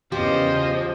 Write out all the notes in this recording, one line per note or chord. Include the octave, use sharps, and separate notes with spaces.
E2 C#3 F3 G4 C5 D#5